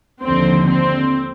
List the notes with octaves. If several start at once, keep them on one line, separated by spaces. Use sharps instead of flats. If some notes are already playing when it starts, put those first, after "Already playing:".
D#2 D3 F3 C4
C4